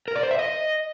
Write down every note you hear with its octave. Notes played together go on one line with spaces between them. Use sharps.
A#4
D5
C5
E5
D#5